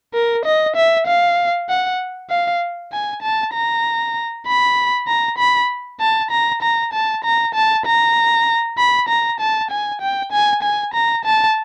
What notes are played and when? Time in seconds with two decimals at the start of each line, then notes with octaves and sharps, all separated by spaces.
0.14 A#4
0.45 D#5
0.76 E5
1.07 F5
1.69 F#5
2.30 F5
2.92 G#5
3.22 A5
3.54 A#5
4.47 B5
5.07 A#5
5.38 B5
6.00 A5
6.31 A#5
6.62 A#5
6.93 A5
7.24 A#5
7.55 A5
7.86 A#5
8.78 B5
9.09 A#5
9.40 A5
9.71 G#5
10.01 G5
10.32 G#5
10.63 G#5
10.94 A#5
11.25 A5